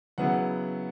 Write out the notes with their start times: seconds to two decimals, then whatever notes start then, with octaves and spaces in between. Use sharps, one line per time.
0.18 C#3 F#3 B3 E4 F#5